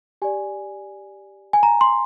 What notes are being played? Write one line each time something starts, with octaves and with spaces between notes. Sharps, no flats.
G4 D5 G#5
G#5
A#5
C6